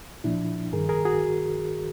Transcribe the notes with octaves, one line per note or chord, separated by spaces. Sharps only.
A#2 F3 D4 E4
G2 D#3 G#4 A#4
G#4 A#4
F#4 G#4